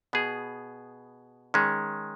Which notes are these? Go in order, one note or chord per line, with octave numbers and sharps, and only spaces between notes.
B2 B3 G#4
D#3 G#3 C#4